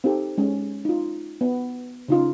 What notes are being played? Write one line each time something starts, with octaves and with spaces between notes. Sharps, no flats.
C4 D#4 G4 A4
G#3 C#4
D#4 F4
B3
C#3 D#4 F4